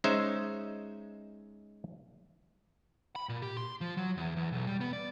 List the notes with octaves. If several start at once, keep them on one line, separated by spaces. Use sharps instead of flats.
G#3 C#4 D#4 C5 E5
B5
A#2
G4
C6
F3
F#3
E2
E2
B1
G3
B3
D5